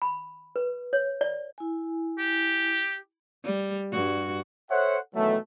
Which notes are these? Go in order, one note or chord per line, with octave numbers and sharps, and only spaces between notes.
B5
B4
C#5
D5
E4 G#5
G4
G3
G2 F#4
A4 C5 C#5 E5 F#5
B2 D#3 E3 F#3 A3